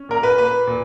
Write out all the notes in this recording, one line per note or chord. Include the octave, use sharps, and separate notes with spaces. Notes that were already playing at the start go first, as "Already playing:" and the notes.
Already playing: C#4
A#2 A#4
B4
A#3 B4
A#2